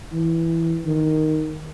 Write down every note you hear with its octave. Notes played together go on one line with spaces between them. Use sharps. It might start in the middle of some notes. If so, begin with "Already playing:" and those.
E3
D#3